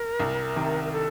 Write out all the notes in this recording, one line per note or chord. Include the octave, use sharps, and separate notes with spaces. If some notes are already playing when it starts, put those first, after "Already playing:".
Already playing: A#4
C2
C3 D#3
A#4
A4